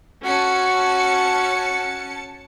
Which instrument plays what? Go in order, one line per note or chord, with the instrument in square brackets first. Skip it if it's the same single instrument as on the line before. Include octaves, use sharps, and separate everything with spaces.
[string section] C#4 A5 C#7 [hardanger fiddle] F#4